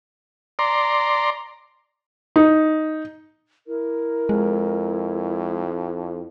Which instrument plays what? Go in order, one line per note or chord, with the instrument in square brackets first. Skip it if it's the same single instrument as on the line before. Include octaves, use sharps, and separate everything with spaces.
[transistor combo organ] D5 A#5 C6
[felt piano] D#4
[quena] E4 [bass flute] A#4
[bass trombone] F2 [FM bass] G#3